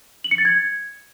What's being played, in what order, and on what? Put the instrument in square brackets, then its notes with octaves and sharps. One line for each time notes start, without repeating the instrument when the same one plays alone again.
[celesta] F#7
C#7
A6
G#6